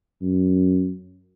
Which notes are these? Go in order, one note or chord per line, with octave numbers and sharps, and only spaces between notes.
F#2